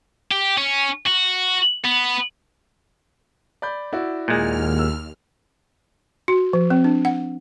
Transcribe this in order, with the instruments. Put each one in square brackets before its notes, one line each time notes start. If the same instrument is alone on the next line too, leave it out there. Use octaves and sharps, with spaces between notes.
[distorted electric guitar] G4
C#4
F#4
B3
[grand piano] D5 B5 G6
E4 F#4 D5
[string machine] D#2 F6 [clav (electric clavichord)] A#2 G#3
[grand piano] E6
[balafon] F#4
F3
C4
D4
F#5